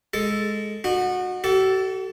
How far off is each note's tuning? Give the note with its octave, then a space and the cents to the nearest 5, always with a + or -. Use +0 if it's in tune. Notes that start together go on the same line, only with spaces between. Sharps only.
G#3 +5 A4 +0
D#4 -40 F#4 -20
F#4 +45 A4 +0